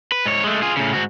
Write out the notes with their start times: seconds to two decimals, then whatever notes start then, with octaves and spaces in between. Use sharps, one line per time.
0.12 B4
0.26 G#2 C#5
0.44 G#3 A3
0.62 F4 G#4
0.77 A2 C#3
0.93 G#2 F#4